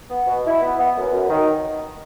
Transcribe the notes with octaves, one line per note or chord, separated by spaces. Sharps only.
B3
B2
E4
B3
B3
F#2
F#2
D#3